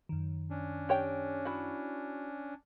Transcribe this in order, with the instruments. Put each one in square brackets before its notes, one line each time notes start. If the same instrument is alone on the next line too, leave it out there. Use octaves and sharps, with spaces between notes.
[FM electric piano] F#2 D#3
[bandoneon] C#4 D4
[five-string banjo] G4 C#5 G5
E4 F#4